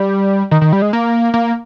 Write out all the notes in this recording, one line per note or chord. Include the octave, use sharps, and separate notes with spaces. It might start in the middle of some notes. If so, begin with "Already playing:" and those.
Already playing: G3
D#3
D#3
G3
G#3
A#3
A#3